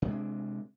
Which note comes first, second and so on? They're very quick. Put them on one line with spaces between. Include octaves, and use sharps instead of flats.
C3 A3 G#3 D4